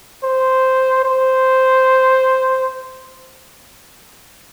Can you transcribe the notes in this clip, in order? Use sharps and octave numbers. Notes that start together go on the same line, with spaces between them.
C5
C5